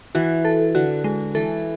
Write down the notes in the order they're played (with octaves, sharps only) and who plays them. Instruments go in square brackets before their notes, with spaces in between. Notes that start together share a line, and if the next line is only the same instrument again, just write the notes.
[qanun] E3 [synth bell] F#4
[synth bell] A4
[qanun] D3 [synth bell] F#4
[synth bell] G#3
[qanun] E3 [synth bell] A4